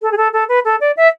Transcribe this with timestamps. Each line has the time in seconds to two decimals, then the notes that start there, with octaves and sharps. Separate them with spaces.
0.02 A4
0.11 G#4
0.17 A4
0.33 A4
0.48 B4
0.64 A4
0.80 D5
0.96 E5